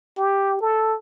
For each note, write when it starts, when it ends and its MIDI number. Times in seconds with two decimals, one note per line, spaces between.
0.18 0.58 67
0.61 0.95 69